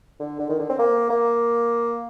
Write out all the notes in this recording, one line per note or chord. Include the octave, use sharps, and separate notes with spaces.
D3
D3
D#3
D3
C4
A#3
A#3